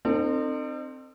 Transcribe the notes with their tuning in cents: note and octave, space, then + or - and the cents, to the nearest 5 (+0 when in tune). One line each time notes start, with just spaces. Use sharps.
C4 +0 D#4 -40 A4 +45